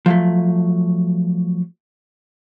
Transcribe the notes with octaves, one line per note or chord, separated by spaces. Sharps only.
F3 F#3 A3